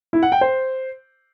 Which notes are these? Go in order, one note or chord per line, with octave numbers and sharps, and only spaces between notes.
E4
F#5
G5
C5